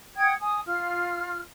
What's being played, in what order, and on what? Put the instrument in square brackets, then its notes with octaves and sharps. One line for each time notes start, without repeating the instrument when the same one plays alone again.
[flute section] F#5 G5 D#6 G#6
G#5 D#6
F4 F6